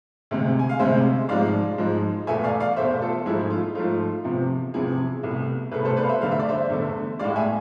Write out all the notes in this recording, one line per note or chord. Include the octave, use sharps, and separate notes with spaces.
D2 C3 G#3
G#5
F5
D2 C3 G#3 C5 E5
G#2 F3 G#3 D5 F5
G#2 F3 G#3
E2 B2 A3 E5 G#5
D5 F5
D5 F5
E2 B2 A3 C5 E5
F4 A4
G#2 F3 A3 E4 G#4
F4
G#2 F3 A3 F4
E2 C3 F3
E2 C3 F3 E4 G#4
C2 B2 A3
C2 B2 A3 G#4 B4
A4 C5
B4 D5
F5
C5 E5
E2 D3 A3 F5
E5
D5
C5 E5
E2 D3 A3
A2 G#3 D5 F5
E5 G#5